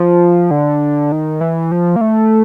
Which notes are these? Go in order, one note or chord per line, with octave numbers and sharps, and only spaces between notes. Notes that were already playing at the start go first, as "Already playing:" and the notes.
Already playing: F3
D3
D#3
E3
F3
A#3
A3